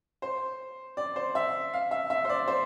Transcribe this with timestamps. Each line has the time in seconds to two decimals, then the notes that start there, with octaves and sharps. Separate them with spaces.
0.22 C5
0.97 D5
1.16 C5
1.35 E5
1.74 F5
1.91 E5
2.10 E5
2.25 C5
2.29 D5
2.48 C5